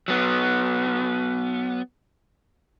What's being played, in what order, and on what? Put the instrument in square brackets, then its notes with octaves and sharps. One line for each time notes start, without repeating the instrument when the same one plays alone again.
[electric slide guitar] F#3 B3